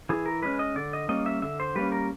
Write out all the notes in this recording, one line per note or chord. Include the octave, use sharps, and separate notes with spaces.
E3 G#4
A#4
G#3 C#4 B4
D#5
D3 D5
D#5
G3 A#3 C#4 D#5
E5
D3 E5
C5
G3 A#3 C#4 B4
A#4